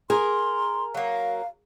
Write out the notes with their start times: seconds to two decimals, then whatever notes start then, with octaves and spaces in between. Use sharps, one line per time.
0.10 G#4 A#4 C6
0.94 F#3 A#3 F5